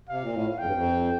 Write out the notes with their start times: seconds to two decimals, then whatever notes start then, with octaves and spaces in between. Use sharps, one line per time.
0.09 C3 F5
0.22 A#2
0.33 A2
0.58 F2 G5
0.65 G2
0.73 F2